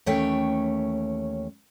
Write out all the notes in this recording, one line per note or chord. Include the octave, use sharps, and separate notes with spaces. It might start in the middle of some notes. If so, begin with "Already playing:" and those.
D#2 E3 A3 C#4 C#5 G5